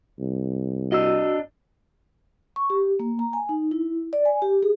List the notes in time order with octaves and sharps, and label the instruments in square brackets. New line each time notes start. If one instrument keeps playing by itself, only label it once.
[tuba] C2
[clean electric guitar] D4 D#5 [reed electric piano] F#4 E6
[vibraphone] C#6
G4
A#3
A#5
G#5
D#4
E4
D5
G#5
G4
G#4